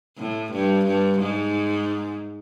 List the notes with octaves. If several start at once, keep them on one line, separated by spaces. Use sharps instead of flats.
A2
G2
G2
G#2